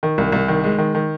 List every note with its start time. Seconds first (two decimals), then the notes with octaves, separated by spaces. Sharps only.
0.03 D#3
0.18 C2
0.32 C2
0.48 D#3
0.64 G#3
0.78 D#3
0.95 D#3